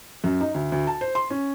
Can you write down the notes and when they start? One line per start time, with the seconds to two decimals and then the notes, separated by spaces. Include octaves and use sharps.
0.24 F#2
0.41 D#4
0.54 D2
0.72 D2
0.87 A5
1.01 C5
1.15 C6
1.30 C#4